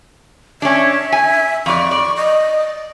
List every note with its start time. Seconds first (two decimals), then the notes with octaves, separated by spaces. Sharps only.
0.62 C#4 D4 E5
1.12 G#5
1.66 F2 D5 C#6
1.91 D5
2.16 D#5